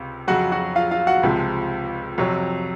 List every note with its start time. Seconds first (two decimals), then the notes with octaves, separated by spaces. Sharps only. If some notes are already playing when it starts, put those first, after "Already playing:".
Already playing: C#2 C3
0.28 F2 C#3 F#3 F#4 F#5
0.52 F#4 F#5
0.76 F4 F5
0.91 F4 F5
1.07 F#4 F#5
1.23 C#2 C3 F3 G#3
2.18 F2 C3 F#3 C#5